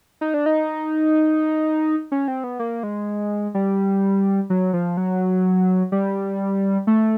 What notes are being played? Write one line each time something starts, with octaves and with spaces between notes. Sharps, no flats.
D#4
D4
D#4
C#4
C4
B3
A#3
G#3
G3
F#3
F3
F#3
G3
A3